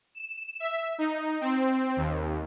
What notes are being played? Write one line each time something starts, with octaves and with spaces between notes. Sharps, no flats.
E7
E5
D#4
C4
D#2